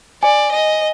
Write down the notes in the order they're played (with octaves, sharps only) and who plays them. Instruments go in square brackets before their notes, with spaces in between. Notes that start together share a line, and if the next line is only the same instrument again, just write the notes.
[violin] D5 [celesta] G#5
[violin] D#5